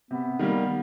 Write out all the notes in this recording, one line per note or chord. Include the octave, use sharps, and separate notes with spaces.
C3 B3
D#3 G3 A#3